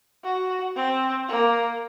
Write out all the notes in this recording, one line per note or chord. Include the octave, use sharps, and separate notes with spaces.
F#4
C4
A#3